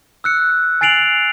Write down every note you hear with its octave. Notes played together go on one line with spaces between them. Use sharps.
E6 F#6 C#7
G#5 A6 C7 D7 F7 F#7